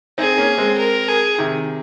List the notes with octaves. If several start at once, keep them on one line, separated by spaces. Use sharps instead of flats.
C4 D#4 G#4
A#3 C#4
G#3 C4
A#4
G#4
C3 D#3